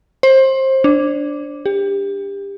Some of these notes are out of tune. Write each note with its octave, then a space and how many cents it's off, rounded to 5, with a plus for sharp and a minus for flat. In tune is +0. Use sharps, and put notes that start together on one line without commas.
C5 +25
D4 -5
G4 +25